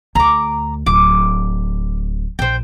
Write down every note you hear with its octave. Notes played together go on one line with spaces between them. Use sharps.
D2 A#5 D6
D1 D6
A#1 C5 G5